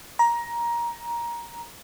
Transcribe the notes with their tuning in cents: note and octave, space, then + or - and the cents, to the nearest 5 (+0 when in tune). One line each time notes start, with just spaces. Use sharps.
A#5 +15